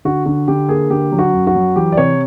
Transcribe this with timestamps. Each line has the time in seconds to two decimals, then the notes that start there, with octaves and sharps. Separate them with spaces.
0.05 D3 F#4
0.26 D3 F#4
0.48 D3 G4
0.69 A#3 G#4
0.90 D3 G4
1.12 F#3
1.19 F#4
1.33 F#2
1.47 F#4
1.55 F#3
1.76 E3 G4
1.92 D5
1.97 C3 C#5